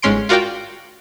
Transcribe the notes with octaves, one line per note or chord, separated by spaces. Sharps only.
G1 G#2 G#3 C#4 C6 D7
F4 F#4 A#4 D5 F5 G5